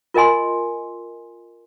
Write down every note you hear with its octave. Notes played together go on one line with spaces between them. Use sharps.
F4 A#4 D#5 G#5 C6